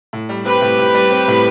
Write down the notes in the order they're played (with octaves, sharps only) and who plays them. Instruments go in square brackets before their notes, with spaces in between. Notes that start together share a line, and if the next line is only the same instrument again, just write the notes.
[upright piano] A2
G3
[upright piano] C4 [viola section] G4 B4
[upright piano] A2
A2
G3
C4
A2